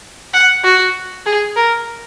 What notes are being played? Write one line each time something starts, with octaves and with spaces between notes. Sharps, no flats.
F#5
F#4
G#4
A#4